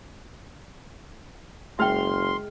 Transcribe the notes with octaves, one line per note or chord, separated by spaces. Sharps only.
F#1 G#3 E5 G5 C6 F6